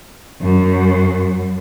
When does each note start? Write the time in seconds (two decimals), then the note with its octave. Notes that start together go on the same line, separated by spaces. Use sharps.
0.42 F#2